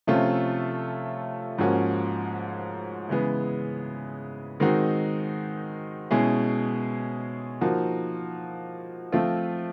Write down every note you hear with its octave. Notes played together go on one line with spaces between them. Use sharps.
C3 F3 A3 C#4 F4
G#2 F3 A#3 C#4 F#4
C#3 E3 G#3 B3
D#3 G#3 C4 D#4 F#4
B2 G#3 C#4 E4 G#4
F3 A#3 D#4 F#4
F3 A3 C4 F4